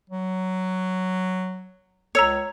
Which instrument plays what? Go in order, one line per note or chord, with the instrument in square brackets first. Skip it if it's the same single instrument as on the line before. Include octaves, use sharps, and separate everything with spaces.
[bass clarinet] F#3
[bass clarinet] C#2 [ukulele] C#5 [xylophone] A#5 E6 C#7